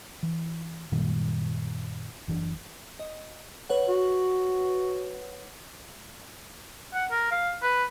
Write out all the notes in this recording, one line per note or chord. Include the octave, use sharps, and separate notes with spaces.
E3
F#2 A#2 D#3 G3
F#1 E3 D4
D#5
B4 C#5 F#5
F#4
F#5
A#4
F5
B4